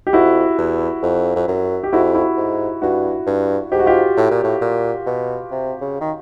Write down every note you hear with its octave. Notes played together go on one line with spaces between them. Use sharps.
G4
F2 E4 F#4
E2
F2
F2
F#2
G4
F2 E4 F#4
E4 F#4
G#2
G2 E4 F#4
G2
G#2 G4
F#4
F4 G4
A2
A#2
A2
A#2
B2
C3
C#3
D#3